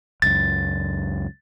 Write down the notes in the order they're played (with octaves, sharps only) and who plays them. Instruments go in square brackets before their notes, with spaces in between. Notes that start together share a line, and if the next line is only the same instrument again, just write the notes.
[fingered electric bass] C#2 F#2 [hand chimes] A6